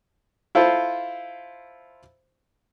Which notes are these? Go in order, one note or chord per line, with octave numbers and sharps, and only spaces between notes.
E4 F4 A4 C5